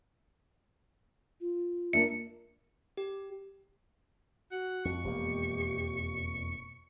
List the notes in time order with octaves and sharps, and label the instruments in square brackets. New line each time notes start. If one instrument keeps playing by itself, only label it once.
[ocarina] F4
[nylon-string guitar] A#3 D4 E5 [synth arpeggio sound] C#7
[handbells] G4
[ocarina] F#4 [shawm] F#5
[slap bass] F2 [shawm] C#6
[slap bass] E1 F2 A#3 [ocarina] G4